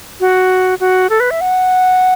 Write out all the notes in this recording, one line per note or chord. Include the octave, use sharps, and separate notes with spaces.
F#4
F#4
A4
B4
E5
F#5